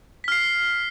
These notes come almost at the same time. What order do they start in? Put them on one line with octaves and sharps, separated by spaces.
B6 F6 C7